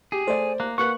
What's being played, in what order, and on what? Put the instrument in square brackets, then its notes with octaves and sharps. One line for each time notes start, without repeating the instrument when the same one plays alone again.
[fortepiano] G4 [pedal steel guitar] G#4
[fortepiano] A3 D5 [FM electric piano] C5
[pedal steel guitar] A#3 [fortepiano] F#6
[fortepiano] A#3 B4 [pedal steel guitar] F#5 [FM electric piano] C#6 F#6